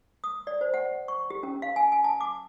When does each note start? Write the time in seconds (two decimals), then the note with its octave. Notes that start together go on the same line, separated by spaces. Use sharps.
0.24 D#6
0.47 D5
0.61 C5
0.74 F#5
1.08 C#6
1.30 G4
1.43 C#4
1.62 F5
1.76 G#5
1.92 G#5
2.04 A5
2.21 D6